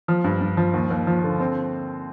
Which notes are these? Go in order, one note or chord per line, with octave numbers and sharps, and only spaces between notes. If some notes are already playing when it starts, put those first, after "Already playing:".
F3
G2
G2
F3
D#2
D#2
F3
D3
C4